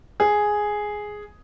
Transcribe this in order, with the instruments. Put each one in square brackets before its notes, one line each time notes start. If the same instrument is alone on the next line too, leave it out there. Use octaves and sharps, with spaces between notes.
[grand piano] G#4